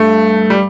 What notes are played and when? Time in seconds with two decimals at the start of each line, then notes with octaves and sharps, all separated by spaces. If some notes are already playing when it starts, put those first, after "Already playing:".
Already playing: G2 A3
0.50 G3